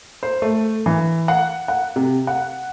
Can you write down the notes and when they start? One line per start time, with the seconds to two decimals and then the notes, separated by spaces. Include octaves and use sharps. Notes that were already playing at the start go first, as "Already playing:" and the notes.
0.23 C5
0.42 A3
0.86 E3
1.28 F#5
1.68 F#5
1.96 C3
2.27 F#5